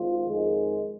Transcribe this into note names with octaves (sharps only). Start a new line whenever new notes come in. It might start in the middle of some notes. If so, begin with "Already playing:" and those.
Already playing: G#1 G#2 F4
F2 D#3 G#3